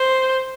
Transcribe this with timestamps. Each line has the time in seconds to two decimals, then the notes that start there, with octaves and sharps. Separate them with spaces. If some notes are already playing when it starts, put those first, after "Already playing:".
Already playing: C5